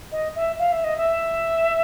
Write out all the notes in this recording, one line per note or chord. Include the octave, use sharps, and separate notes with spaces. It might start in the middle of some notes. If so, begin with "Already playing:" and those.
D#5
E5
F5
E5
D#5
E5